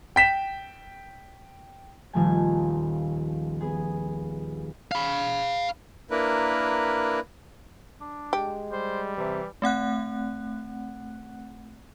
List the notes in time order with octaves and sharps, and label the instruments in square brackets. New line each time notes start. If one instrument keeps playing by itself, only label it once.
[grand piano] G5 B6 E7
[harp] D#1 F3 A3 G#5
B3 G#4
[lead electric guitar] F5 B5
[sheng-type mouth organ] A#3 D4 E4 A#4 B4
[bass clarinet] D4
[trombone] G#3 [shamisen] G4
[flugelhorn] G3 [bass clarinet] C5
[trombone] C3 [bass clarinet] E3
[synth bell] A3 C4 F#5 F#6